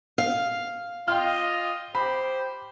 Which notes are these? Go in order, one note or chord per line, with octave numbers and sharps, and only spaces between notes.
F5
F4 D#5 G5 C6 F6
G4 C5 B5